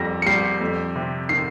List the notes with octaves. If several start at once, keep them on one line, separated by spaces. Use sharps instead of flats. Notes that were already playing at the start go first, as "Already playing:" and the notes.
Already playing: F2 G3 A#6
C#7
G3 C7
F2
C3
D#3 C7